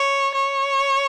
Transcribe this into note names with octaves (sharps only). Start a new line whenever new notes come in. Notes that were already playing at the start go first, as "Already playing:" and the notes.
Already playing: C#5
C#5